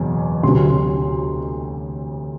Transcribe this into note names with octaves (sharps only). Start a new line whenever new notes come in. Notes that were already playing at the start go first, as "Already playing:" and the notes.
Already playing: F#1 E2 B2 F#3
D2 C3 F#3 C6